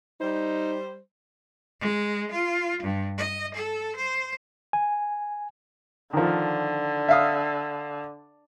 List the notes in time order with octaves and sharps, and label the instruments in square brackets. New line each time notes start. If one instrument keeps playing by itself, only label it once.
[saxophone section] G3 C5 [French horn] D#4
[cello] G#3
F4
G2
D#5
A4
C5
[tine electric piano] G#5
[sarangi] D3 [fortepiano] D#3 F3
[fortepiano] E5 F5 D#6